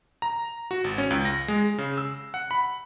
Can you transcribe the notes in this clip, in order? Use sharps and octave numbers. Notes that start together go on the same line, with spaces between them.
A#5
F#4
G#1
C#4
C#2
A#6
G#3
C#3
E6
F#5
B5